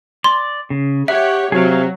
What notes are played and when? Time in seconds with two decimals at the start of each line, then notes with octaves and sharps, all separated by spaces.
0.24 D5 C6
0.70 C#3
1.08 G4 C#5 E5 F#5
1.52 C3 F#3 G#4 F5